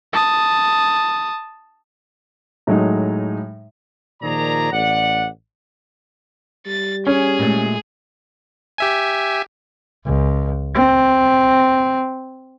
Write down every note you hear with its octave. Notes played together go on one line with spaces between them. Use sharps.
A5 D#6
A2 F#3 G#3 D#4
A#2 D#3 F3 G#4 D5 A#5
A1 D5 F#5
G3 A6
C#4 G#4
A#2 G#3 A3
G4 E5 G#5
C#2
C4